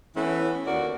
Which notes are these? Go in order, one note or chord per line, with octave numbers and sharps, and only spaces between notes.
E3 A3 B3 C#4 E4
D#2 D3 F#4 A#4 D5